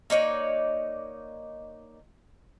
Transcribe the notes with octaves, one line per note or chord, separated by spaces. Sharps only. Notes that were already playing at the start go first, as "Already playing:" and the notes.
A#3 D#4 C#5 D5